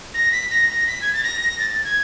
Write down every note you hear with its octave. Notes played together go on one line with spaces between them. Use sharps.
A#6
B6
A#6
A#6
B6
G#6
A6
A#6
A6
G#6